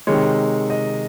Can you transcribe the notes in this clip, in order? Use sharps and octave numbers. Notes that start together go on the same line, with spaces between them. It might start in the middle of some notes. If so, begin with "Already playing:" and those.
C3 D#3 G#3 C#5
D#5